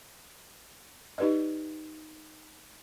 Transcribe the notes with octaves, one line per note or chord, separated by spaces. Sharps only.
D#4 G4 B4 D5 D#5